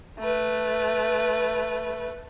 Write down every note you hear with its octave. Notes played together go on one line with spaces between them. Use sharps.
A3 B4